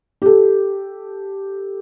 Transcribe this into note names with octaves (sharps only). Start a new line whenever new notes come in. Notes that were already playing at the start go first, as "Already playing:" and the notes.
G4 A4